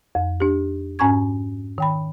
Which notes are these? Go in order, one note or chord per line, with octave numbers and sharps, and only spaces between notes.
F2
D4 G4
G#2 C#4 G#5 A#5 C#6 G#6
D#3 G5 B5